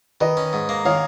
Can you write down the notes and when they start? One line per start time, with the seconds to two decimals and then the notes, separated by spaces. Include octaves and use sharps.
0.21 D#3 B4 D#5
0.37 C#4
0.53 G#2
0.69 A#3
0.85 D#3 C#5 F5